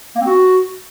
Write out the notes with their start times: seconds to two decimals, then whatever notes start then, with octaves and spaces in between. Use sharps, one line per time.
0.16 A#3
0.21 C4
0.26 F#4